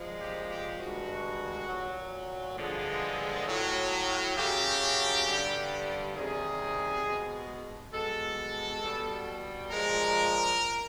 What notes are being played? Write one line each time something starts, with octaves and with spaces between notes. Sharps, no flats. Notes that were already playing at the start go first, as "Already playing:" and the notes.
Already playing: A#2 F3 G#3
G4
G4
G2 D#3 G#3 F#4
A#2 F#3
G2 D3 F3 G#3
A2 F#3
F#2 C#3 F#3 G4
G2 D3 G3
C3 D#3 G3 G#4
B2 G#3
B2 G#3 A4
B2 G3
A#2 F3 G#3 A#4